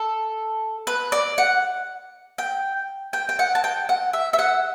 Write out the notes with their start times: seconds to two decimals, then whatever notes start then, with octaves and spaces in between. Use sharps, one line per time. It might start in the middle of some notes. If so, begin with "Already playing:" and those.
Already playing: A4
0.87 B4
1.12 D5
1.38 F#5
2.38 G5
3.13 G5
3.29 G5
3.39 F#5
3.55 A5
3.64 G5
3.89 F#5
4.13 E5
4.33 E5
4.39 F#5